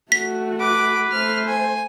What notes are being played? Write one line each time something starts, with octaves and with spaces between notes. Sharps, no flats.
A3 F#4 B6
B4 D6
A3 C5 F6
G#5